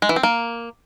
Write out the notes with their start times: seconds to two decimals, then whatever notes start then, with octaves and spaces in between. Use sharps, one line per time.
0.02 G#3
0.09 E3
0.16 C4
0.23 A#3